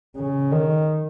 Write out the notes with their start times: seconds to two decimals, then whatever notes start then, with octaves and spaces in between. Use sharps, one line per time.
0.16 C#3
0.52 D#3